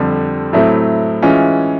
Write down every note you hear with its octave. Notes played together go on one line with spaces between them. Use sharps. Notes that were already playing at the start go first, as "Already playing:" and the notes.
Already playing: F2 D3 G3
A2 F#3 A3 C4 E4
E3 G#3 C#4 F4